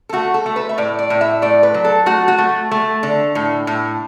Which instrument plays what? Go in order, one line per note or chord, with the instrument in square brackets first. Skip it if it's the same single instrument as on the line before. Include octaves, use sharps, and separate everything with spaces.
[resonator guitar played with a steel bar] A4
A3 F#4
A4
A3
B4
E5
A2 D5
D5
A2
E5
A3 D5
B4
F#3
A4
A3 F#4
F#4
A3
A3
D3
A2
A2